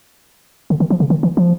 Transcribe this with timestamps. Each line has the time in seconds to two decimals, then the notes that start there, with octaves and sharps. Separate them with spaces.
0.70 D3
0.80 D#3
0.90 F3
1.00 C#3
1.10 D#3
1.23 E3
1.37 F3